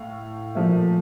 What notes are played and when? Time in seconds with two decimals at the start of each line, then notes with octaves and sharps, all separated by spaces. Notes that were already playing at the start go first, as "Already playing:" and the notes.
Already playing: A2 F5
0.55 A#2 F3 A3